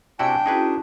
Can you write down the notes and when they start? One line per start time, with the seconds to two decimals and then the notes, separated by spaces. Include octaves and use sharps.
0.19 C3 D4 E4 F#4 D5 G5 G#5
0.46 C#4 D#4 E4 F#4 G#4 B4